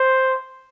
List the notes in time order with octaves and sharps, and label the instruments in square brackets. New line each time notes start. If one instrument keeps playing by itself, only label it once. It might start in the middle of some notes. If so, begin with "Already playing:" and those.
Already playing: [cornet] C5